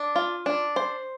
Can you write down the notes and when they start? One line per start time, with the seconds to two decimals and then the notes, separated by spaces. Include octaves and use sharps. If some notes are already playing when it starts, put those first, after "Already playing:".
Already playing: D4
0.15 F4
0.46 D4
0.76 C5